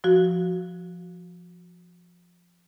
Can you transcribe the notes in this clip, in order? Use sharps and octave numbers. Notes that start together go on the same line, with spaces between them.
F3 F#4